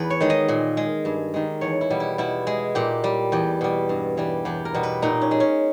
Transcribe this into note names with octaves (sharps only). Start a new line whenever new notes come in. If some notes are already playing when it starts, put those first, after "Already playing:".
Already playing: E2 B4
C#5
D#3 G#3
D#5
A#2
G#3
G2
D#3 G#3
E2 C#5
E4
B2 G3
E4
B2 E4
G#3
A#2 G4
G3
E2 G4
B2 G3
G2
E3 G3
E2 G4
A#4
B2 G3
B4
A#2 D#4
C#4
G#3
C#4